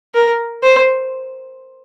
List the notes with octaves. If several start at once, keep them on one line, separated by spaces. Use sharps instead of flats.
A#4
C5